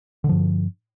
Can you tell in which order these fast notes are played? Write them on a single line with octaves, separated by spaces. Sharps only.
D3 D#3 F3 G2